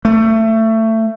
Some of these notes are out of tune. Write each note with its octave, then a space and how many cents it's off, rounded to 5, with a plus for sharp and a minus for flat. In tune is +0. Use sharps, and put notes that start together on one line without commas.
A3 +20